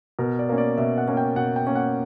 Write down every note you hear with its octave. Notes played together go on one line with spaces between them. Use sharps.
B2 A#4
D5
A#3 C#4
D5
B2 E5
F#5
A#3 C#4
G5
B2 F#5
G5
A#3 C#4
F#5